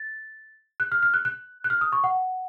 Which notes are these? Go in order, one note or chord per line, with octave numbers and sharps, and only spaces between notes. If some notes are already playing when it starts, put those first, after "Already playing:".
Already playing: A6
F#6
F6
F6
F#6
F#6
F#6
F6
D#6
C#6
F#5